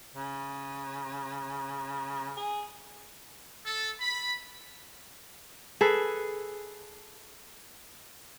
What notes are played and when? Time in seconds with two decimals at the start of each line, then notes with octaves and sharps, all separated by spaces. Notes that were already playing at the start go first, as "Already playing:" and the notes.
0.15 C#3
2.37 G#4
3.66 A4
4.01 B5
5.81 G#4 A4 B4